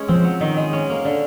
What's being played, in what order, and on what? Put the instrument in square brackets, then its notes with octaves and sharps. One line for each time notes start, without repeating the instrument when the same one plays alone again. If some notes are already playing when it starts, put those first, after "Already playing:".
Already playing: [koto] G#3 C#4
[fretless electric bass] F3 [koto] C4
[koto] F#3
D#3
G#3
C#4
A#3
D3